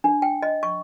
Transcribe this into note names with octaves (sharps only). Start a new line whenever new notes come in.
D4
G5
D#5
C#6